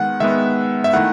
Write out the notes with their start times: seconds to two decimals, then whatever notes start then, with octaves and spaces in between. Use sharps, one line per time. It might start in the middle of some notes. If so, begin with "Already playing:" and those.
Already playing: D#3 G#3 B3 F#5
0.20 D#3 G#3 B3 E5
0.84 E5
0.93 D#3 A3 E4 F#5